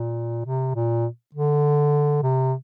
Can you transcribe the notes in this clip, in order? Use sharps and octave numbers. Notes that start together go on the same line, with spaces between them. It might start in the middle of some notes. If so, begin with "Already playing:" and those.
Already playing: A#2
C3
A#2
D3
C3